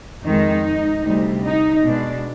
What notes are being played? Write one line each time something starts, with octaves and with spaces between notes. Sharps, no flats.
F2 D#3 G#3 D#4
D2 C3 G3
D#4
B2 G#3 D4